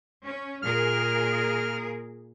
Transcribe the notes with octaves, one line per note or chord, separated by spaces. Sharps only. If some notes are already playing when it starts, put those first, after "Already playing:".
C#4
A#2 G#4 A#4 F6